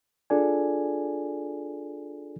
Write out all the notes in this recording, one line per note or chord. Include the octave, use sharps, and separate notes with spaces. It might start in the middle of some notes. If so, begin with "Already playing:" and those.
D4 F4 G#4 A4 D5 G#5